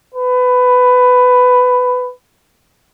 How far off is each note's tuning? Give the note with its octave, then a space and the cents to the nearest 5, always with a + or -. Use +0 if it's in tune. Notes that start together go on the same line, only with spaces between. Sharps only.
B4 +15